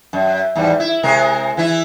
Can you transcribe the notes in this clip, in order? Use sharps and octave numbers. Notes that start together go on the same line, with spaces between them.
F#2
E2 G#2 G3
E4
C3 G#3 A#4
E3 E4